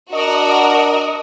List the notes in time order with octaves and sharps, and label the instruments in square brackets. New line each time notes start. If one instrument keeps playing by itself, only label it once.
[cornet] D4 [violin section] F#4 A#4 [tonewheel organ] D#5